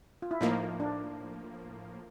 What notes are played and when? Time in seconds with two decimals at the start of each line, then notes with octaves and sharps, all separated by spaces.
0.22 F4
0.31 E4
0.41 A2 F3 A#3 D#4
0.80 D4